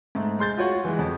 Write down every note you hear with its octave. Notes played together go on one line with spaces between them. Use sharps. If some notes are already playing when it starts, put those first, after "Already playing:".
G#2 A3
G#3 C6 G6 A6
F4 F#4 C#5 F#5
E3 G#3
F2